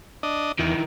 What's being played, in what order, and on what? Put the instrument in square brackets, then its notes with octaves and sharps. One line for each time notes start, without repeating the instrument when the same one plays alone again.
[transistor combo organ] D4 D#5
[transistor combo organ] E2 [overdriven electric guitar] D#3 E3